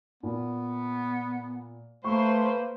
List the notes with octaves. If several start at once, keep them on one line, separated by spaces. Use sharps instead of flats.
A#2 B3
A3 A#3 B4 C5 C#6